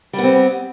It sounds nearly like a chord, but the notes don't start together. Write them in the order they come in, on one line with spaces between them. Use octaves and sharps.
G3 B3 C4